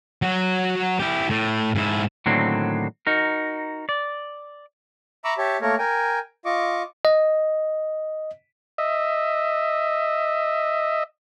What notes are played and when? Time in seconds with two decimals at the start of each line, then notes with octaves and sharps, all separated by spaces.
0.22 F#3 F#4
0.99 E4 G4
1.30 A2
1.75 G#2 E4
2.26 A2 D3 D#3 F#3 A#3 C4
3.07 D#4 F#4 A#4
3.89 D5
5.25 E5 A#5 B5 C#6 D6 E6
5.38 G4 C#5 E5 A5
5.61 A3 A#3 A#4 C#5
5.79 A#4 G5 G#5
6.45 F4 D#5 C#6 D6
7.05 D#5
8.78 D#5 E5